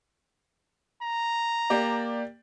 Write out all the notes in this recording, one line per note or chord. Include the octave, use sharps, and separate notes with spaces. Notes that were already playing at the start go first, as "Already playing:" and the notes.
A#5
A#3 G4 D5